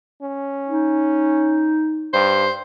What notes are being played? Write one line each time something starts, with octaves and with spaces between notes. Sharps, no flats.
C#4
D#4
G2 C5